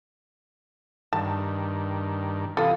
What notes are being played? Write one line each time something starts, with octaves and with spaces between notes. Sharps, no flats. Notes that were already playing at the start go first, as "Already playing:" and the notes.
G2 D#3 A5
C3 E3 F4 A4 D#6